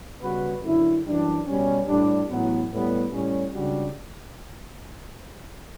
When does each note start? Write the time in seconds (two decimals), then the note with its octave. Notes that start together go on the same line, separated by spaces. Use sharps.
0.20 C#3 G3 B3 F#4 B4
0.62 F#2 D3 A3 E4
1.04 F#2 E3 G3 D4
1.46 B2 G3 C#4
1.87 A2 G3 D4
2.29 A1 A2 F#3 B3
2.70 A2 G3 B3
3.12 A2 G3 C#4
3.53 C#2 C#3 G3 D4 F#4